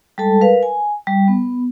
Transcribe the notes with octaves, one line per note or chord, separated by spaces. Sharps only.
G3 G#3 A4 A5
A#4 B4 F5
G#5
G3
B3